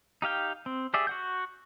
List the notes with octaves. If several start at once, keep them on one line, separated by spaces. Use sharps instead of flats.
D#4 G4 F5 G5
C4
G4 G#4 D5 E5
F#4 F#5 G6